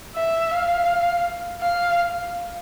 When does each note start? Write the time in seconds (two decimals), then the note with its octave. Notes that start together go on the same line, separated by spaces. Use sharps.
0.15 E5
0.51 F5
1.60 F5